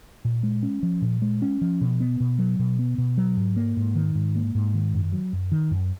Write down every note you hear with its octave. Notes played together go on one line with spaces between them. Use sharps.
A#2
G#3
C#4
F3
A#2
G#3
C#4
F3
B2
B3
B2
F#3
B2
B3
B2
F#3
G#2
A#3
G#2
D#3
G#2
A#3
G#2
D#3
F#2
F#3
F#2
D#3
F#2